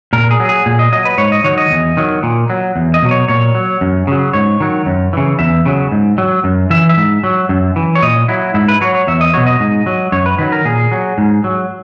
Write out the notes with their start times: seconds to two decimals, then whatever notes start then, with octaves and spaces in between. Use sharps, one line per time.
0.13 A#2 A#4
0.31 G#4
0.40 F#3
0.49 G#4
0.66 A#2 G#4
0.79 D#5
0.93 F#3 D#5
1.05 B4
1.18 G#2 C#5
1.32 D#5
1.44 D#3 F#3 C#5
1.58 D#5
1.71 E2
1.97 D#3 F#3
2.23 A#2
2.50 F#3
2.76 E2
2.94 D#5
3.02 B2 F#3
3.11 C#5
3.28 A#2 C#5
3.55 F#3
3.81 F#2
4.07 C#3 F#3
4.33 G#2 C#5
4.60 D#3 F#3
4.86 F#2
5.13 C#3 E3
5.39 E2 E5
5.65 C#3 F#3
5.92 G#2
6.18 F#3
6.44 F#2
6.70 E3 E5
6.89 E5
6.97 G#2
7.24 F#3
7.49 F#2
7.76 E3
7.95 C#5
8.02 A#2 D#5
8.28 F#3 E4
8.54 G#2 E4
8.68 B4
8.81 F#3 C#5
8.95 C#5
9.07 E2 E5
9.21 D#5
9.34 B2 F#3 C#5
9.46 D#5
9.60 G#2
9.86 F#3
10.12 F#2 C#5
10.26 B4
10.39 D#3 F#3 B4
10.52 A#4
10.65 A#2 G#4
10.92 F#3
11.18 G#2
11.44 F#3